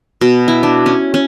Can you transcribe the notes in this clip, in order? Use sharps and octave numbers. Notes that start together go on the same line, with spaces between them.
B2
E4
D4
C#4
C#4